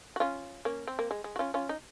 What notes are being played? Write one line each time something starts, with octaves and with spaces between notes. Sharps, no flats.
F#4
C#4 F4
A#3 C#4
C4
A#3
G#3
G#3
F#4
C#4 F4
C#4 F4
D#4